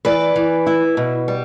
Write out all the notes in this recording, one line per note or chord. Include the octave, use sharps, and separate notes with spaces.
E3 B4 D5
E3
E4
B2
G3